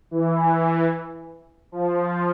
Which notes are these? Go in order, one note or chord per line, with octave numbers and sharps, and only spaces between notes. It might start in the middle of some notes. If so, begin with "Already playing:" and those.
E3
F3